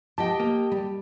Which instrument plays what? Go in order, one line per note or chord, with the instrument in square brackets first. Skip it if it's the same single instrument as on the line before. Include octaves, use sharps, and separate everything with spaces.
[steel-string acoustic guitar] G4 D#5 G5 [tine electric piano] A5
[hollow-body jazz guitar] A#3
G3